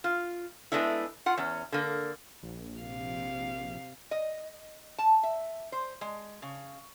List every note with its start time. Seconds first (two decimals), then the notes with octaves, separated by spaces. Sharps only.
0.04 F4
0.72 G#3 A3 B3 D4 E4
1.26 F4 F#5
1.37 E2 C#4
1.72 D3 A#3
2.43 A#1
2.80 C3 F5
4.11 D#5
4.98 A5
5.23 E5
5.72 C5
6.01 G#3
6.42 C#3